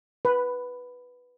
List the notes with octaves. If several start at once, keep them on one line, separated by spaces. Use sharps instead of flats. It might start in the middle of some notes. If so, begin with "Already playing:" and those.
B4